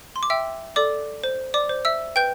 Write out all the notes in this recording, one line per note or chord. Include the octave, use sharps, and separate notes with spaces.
C6
D6
E5 G5 E6
A4 D5 D6
C5
D5 D6
C5
E5 E6
B4 G5 G6